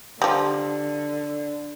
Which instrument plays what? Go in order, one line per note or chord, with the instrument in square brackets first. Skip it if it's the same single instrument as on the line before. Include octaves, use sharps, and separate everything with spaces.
[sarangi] D3 [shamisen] F3 G3